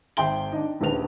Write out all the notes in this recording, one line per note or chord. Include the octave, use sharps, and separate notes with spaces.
G#1 E5 G5 C6 G7
D4 D#4
D#1 A#1 D#3 B4 F7